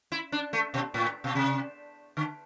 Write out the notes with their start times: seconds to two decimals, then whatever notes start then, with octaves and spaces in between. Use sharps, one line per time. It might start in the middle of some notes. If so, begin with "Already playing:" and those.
0.12 E4
0.32 D4
0.53 A3
0.74 B2
0.94 A2
1.24 B2
1.35 C3
2.17 D3